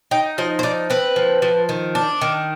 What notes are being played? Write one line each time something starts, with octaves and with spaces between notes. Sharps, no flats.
D#4 G5
F3 D#5
C5
D#4 D5
C4 B4
F3
F3
D#3
D4
D#3